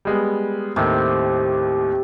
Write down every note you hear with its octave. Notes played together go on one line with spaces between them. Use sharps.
G3 G#3 B3
D#2 A2 C3 D#3